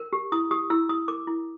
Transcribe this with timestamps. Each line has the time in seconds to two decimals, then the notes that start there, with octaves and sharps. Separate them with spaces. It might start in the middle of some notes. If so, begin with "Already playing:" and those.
Already playing: A#4
0.13 G4
0.32 E4 D#6
0.51 G4 D#6
0.70 E4 E6
0.89 E4 D#6
1.08 A#4 D6
1.27 E4